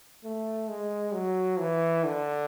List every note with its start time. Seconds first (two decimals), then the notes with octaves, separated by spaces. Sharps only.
0.24 A3
0.69 G#3
1.13 F#3
1.59 E3
2.05 D3